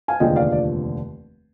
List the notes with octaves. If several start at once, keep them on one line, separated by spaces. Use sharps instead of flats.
F5 G#5
F1 D#2 D3 F3 G#3 D#5 G5
D5 F5
D5